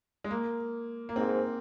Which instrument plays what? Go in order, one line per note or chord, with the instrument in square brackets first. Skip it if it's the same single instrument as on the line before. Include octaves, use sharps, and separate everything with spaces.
[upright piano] G#3
A#3
A#3
[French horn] G#2 [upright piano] C4